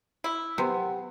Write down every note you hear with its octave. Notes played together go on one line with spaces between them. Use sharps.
E4
C3 B3